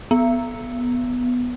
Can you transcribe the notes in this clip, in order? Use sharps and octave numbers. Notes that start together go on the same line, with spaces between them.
B3